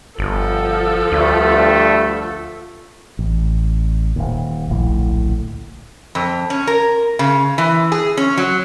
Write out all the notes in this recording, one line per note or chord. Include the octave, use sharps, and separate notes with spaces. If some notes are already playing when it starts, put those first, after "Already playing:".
G1 F3 A4
D2 G2 A3
A1
D#1 D#2
D1 A#1 A2
F2
C#4
A#4
C#3
E3
G#4
C#4
F#3